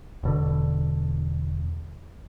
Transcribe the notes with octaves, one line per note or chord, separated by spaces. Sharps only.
E1 B2 D3